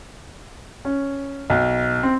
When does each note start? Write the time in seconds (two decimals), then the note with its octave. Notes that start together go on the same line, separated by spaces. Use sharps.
0.85 C#4
1.50 B1
2.03 C4